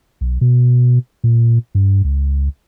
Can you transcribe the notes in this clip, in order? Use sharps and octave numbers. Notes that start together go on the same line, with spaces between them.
B1
B2
A#2
G2
C#2